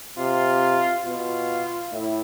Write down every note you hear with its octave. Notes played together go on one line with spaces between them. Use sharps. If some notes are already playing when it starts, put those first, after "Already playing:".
C3 F4
B2 F4
A2 E4